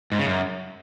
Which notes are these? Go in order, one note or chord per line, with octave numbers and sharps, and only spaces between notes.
G#2
C#3
F#2